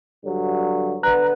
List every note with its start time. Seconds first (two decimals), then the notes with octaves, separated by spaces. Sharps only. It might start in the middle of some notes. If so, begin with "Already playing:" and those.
0.25 G2 D3 F#3
1.03 D3 B3 A#5 F#6